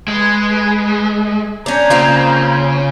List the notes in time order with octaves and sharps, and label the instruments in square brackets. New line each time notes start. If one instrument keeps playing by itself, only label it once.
[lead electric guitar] G#3 [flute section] G#4 B4
[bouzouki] C#4 D4 [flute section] A#5 G6 G#6
[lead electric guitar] C#3 [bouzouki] A#3 C4 F4